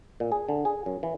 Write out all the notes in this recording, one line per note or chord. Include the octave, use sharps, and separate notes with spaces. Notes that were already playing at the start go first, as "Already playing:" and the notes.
A#2
G#4
D3
G#4
F#2
E3